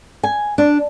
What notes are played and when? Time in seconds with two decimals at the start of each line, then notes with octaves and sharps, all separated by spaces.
0.23 G#5
0.58 D4